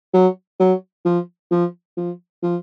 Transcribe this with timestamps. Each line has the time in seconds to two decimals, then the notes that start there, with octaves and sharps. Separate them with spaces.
0.14 F#3
0.60 F#3
1.05 F3
1.51 F3
1.97 F3
2.43 F3